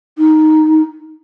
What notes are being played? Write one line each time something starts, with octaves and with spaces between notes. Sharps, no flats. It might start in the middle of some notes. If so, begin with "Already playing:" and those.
D#4